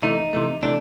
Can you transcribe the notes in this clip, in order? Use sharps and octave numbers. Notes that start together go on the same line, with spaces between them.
C3 E3 A3 D#4
C3 E3 A3
C3 E3 A3 D4